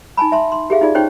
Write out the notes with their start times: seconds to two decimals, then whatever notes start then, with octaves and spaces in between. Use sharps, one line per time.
0.17 D#4 G#5 A5 B5
0.32 E5 A5 C6
0.52 C6
0.70 G4 G#4 E5 F5
0.81 D#4 F4 G#4 D5
0.95 C#4 D#4 C5 C#5 G5 C#6